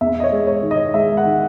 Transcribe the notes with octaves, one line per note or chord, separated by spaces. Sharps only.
E2 E5
D#5
C#5
G#3
C#5
D#3
D#5
G#3 E5
F#5
D#3